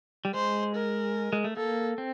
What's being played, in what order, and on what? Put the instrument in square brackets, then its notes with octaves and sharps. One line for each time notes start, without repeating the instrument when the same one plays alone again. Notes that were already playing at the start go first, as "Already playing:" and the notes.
[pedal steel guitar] G3
[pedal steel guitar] G#3 [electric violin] C5
[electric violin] A#4
[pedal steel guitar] G#3
A3
[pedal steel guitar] A#3 [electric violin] A4
[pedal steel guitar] C4